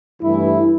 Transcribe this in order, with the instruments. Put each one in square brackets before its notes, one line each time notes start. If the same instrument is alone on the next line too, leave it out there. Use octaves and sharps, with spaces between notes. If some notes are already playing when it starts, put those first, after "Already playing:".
[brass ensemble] G2 E3 A3 E4